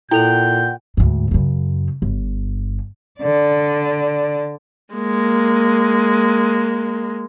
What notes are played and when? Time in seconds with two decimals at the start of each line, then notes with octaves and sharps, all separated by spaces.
0.11 A#2 E4 A4 F#5 G5 G6 F7
0.97 D2 G#2
1.31 F#2 C#3
2.02 G1
3.19 D3 D5
4.94 G#3 A#3